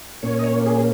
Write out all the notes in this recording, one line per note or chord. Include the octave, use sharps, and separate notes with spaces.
A#2 A#3 C#4 C#5
D#5
C#5
G#4